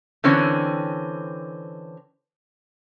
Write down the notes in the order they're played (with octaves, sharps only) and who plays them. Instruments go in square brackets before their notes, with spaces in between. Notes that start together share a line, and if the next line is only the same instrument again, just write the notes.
[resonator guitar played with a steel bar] D3 E3 C4 C#4